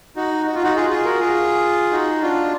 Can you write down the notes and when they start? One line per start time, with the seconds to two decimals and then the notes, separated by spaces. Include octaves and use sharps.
0.16 D#4 F#4
0.46 F#4
0.54 F4
0.63 D#4 F#4
0.75 F4 G#4
0.90 F4 G#4
1.05 F#4 A#4
1.19 F4 G#4
1.92 D#4 F#4
2.22 D4 F4